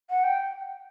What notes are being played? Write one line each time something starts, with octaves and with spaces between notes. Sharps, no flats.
F#5
G5